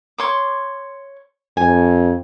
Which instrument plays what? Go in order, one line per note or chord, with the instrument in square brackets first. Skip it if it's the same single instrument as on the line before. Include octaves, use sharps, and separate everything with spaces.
[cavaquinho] C#5 C6 D6
[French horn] F2 [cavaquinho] G#5